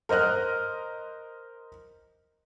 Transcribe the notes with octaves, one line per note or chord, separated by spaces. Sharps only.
A#4 C5 D#5 F6 F#6